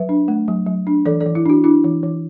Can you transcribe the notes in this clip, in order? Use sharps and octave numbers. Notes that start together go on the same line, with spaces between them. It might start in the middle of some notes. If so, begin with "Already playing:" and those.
Already playing: F#3 B4 E5
D4
A3
F#3
F#3
D4
E3 A4 D5
A4 D5
E3
E4
D4 F#4
D4 E4
E3
E3